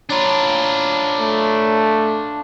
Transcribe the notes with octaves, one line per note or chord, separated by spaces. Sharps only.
D4 F4 C#5 A#5 B5
A3